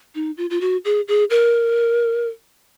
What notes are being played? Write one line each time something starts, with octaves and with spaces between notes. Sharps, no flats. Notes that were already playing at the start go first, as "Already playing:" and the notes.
D#4
F4
F4
F#4
G#4
G#4
A#4